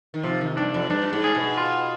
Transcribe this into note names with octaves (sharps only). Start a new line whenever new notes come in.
D#3
C3 F3
D#3
G2 D4
F2
G2 D4
G#2
G#4
B2
F4